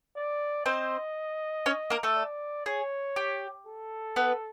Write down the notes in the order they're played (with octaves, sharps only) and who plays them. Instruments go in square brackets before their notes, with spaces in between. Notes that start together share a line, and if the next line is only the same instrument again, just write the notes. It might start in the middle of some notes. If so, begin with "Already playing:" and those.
[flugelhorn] D5
[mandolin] C4 C5 [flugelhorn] D#5
[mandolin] C#4 C#5
A#3 A#4
A3 A4
[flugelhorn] D5
[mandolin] G#4 [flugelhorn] C#5
[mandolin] G4
[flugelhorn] A4
[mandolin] B3 B4